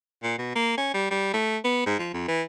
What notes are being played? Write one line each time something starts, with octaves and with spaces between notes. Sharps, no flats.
A#2
B2
A#3
C#4
G3
G3
A3
B3
G#2
F3
F2
E3